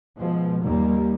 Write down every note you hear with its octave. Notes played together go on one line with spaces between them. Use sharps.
B2 F3 G#3
D#2 D#3 G3 A#3